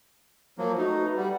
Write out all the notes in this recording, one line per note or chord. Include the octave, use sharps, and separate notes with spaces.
F3 F#3 A#3
A3 D#4 F#4
B4
G3 F#5